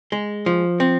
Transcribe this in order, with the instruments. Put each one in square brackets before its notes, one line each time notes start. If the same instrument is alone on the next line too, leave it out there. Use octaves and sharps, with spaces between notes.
[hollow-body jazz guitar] G#3
F3
C4